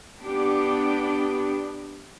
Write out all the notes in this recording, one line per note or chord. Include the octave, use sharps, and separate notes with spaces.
B3 D4 G4